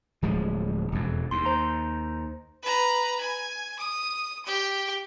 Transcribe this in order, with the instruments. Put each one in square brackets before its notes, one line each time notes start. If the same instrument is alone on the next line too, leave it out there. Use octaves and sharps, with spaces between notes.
[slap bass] D1 F3 G#3
E1 F2
[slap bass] D#2 [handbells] C6
[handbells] C5 A#5
[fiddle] B4 A#5
G#5
D#6
G4 G5